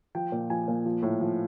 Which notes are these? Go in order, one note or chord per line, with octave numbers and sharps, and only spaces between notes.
F3 G5
A#2
F3 G#5
A#2
F3
A2
F3